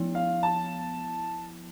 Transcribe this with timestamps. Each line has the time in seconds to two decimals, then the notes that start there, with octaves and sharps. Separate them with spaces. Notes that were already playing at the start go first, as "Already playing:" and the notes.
Already playing: F3 B3 E4
0.15 F5
0.43 A5